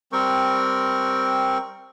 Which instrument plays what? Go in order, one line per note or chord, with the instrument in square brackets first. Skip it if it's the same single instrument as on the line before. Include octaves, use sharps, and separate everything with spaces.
[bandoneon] G3 C4 A#4 G5 C#6